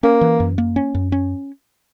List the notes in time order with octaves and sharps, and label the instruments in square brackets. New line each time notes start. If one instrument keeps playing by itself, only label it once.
[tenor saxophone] A#3 [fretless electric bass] C#4
[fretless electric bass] E3
F#2
A#3
C#4
F#2
C#4